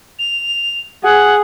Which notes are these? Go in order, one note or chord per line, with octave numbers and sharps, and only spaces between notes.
F7
G#4 F#5